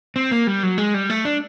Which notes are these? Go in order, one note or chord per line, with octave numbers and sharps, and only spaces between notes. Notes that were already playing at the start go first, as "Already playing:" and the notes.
C4
A#3
G3
F#3
G#3
G3
A3
D4